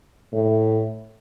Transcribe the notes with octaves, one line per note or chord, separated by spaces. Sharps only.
A2